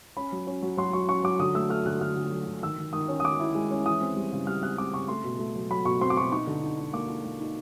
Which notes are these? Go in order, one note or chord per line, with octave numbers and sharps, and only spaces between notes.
C#4 B5
F#3
C#4
F#3
F#3 C6
F#3 C#6
C#4 C#6
F#3 D6
D3 D#6
A3 E6
A3 F6
D3 F#6
D3 F6
D3
F#3
D3
D#3 E6
D#3
D#3 D#6
C#4
D#6
D#3 D6
E4
G#3
C#4
E3 D#6
C4
G3
C#3
G3 F6
C4 F#6
C4 D6
C#3 C#6
A3 C6
B2
A3
F#3
F#3 B5
B2 C#6
C4 C6
D6
B2 C#6
D#4 C#6
D3
D#4
D#4
A#3 D6
D#4
A#3
D#4